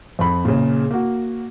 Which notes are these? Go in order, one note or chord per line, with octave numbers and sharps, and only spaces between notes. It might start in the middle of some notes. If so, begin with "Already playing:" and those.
F2 B5
A#2 C#3
A#3 F#4